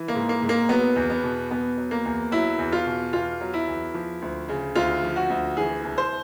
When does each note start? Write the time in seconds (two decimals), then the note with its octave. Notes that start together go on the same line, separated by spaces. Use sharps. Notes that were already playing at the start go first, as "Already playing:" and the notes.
Already playing: E3
0.08 A#3
0.15 G#2
0.29 A#3
0.42 G#2
0.49 A#3
0.69 F#3 B3
0.96 E2
1.10 B3
1.23 B2
1.51 E2 B3
1.77 F#3
1.91 A#3
2.05 E2
2.32 F#3 E4
2.58 E2
2.72 F4
2.86 B2
3.13 E2 F4
3.40 F#3
3.54 E4
3.68 E2
3.94 F3
4.22 D2
4.49 C#3
4.75 D2 F4
5.03 F3
5.16 F#4
5.30 D2
5.57 E3 G#4
5.84 C2
5.98 C5